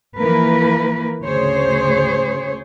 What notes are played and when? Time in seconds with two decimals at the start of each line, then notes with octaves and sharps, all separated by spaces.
0.17 E3 F3 A#3 A#4 B4
1.23 D2 C#3 G#4 C5 C#5